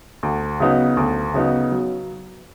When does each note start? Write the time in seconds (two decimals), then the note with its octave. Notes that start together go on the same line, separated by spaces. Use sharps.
0.23 D2
0.60 C#3 F#3 B3 D#4
0.97 D2
1.34 C#3 F#3 B3 D#4
1.72 F#3